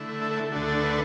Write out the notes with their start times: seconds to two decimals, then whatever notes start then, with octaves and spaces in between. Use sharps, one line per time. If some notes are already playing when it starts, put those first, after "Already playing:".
Already playing: D3 A3 E4
0.22 A4
0.37 A4
0.52 D2 D3 A3 D4 F#4
0.68 A4
0.82 B4